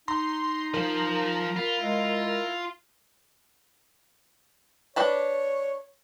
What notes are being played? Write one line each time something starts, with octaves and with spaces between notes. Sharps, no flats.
D#4 A#5 C6
F3 A#4 C5
F4 B5
G#3 E4
D4 B4 C#5 A5